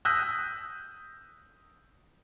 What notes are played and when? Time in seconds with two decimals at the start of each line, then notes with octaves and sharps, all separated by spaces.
0.05 D#6 E6 F#6 G6 A#6 B6